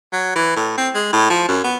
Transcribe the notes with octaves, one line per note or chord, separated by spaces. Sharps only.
F#3
E3
A2
C4
G#3
A2
F3
F#2
B3